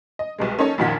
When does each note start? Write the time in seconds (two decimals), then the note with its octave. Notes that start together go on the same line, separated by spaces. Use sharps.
0.19 D#5
0.38 C2 B2 G#3
0.58 A#3 C#4 D#4 A4 C#5 D#5
0.78 A#1 F2 A#2 D#3 F#5 B6